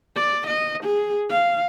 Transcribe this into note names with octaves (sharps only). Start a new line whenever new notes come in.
D5
D#5
G#4
F5